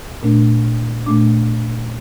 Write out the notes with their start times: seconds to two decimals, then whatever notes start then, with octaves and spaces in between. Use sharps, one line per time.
0.23 A#2 A3 D4
1.06 A#2 A3 D4 D6